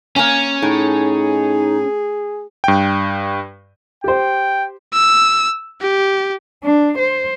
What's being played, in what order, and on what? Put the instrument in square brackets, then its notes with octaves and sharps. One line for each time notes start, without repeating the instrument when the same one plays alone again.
[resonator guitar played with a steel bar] A#3 G#5 [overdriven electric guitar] C#4
[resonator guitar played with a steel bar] A2 [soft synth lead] D#4 [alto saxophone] G#4
[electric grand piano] G2 G5
[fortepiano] G4 C5 [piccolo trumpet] G5
[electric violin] E6
G4
[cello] D4
C5